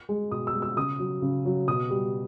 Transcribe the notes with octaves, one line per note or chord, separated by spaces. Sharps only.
G#3
B2 D#6
E6
G#3
E6
C#3 D#6
F#3
C#3
F#3
B2 D#6
G3